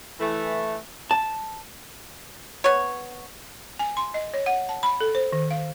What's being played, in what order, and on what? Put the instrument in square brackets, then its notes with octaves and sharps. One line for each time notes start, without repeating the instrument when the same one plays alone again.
[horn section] E3 A3
[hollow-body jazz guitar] A5
[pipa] B3 C#5
[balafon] G#5
C6
D#5
C#5
F#5
A5
B5
A4
C5
D#3
F5